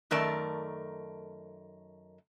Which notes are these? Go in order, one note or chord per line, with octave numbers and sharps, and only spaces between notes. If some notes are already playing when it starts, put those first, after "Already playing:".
F#2 D#3 A3 A#4 D5 A5